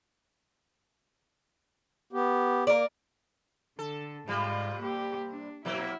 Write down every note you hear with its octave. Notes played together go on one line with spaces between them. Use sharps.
B3 G4
A#3 A#4 D5
D3 A4
G#2 C3 G3 F4
A#3 G4
D4
B2 F#3 A#3 E4